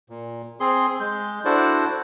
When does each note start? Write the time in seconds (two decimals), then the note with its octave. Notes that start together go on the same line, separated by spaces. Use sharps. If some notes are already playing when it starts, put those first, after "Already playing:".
0.09 A#2
0.60 C4 G#4 C6
1.00 G#3 G6
1.45 D4 E4 F#4 A4 C5 D5